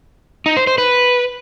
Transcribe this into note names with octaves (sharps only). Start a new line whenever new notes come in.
D#4
C5
C5
B4